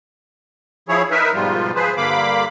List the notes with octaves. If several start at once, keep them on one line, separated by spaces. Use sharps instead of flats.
F3 E4 G#4 C#5
D#4 A#4 B4 E5
G#2 B2 F3 G3 F4
F3 G#4 B4 C5
G2 D3 A#3 F5 B5 D6